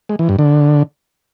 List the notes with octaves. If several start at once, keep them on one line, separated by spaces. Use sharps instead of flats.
G#3
E3
G2
D3